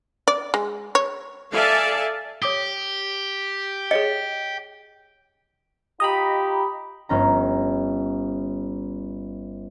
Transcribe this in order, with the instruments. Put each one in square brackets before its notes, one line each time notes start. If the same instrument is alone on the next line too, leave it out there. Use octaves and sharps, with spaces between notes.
[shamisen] D5
G#3
C#5
[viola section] A4 D5 E5 F5 G#5 A5
[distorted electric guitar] G4 [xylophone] C#5 D6 D#6
[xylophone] G#4 C#5 C#7 [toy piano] D#5
[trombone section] D#4 F4 G4 [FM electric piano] D#5 A#5 B5
[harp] G1 C#4 A#5